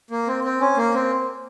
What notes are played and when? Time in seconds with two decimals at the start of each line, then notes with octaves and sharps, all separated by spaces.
0.10 A#3
0.27 C4
0.44 C4
0.60 C#4
0.77 A#3
0.94 C4